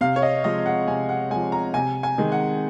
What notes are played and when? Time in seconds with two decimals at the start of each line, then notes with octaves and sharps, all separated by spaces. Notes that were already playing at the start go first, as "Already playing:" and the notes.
0.01 C3 F5
0.16 C#5
0.22 D#5
0.44 F3 G#3 D#5
0.66 F#5
0.88 C3 G#5
1.09 F#5
1.31 F3 G#3 G#5
1.52 A#5
1.74 C3 G#5
2.03 G#5
2.18 D#3 G#3
2.32 F#5